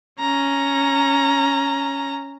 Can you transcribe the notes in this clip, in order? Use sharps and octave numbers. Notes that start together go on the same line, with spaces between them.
C#4 A#5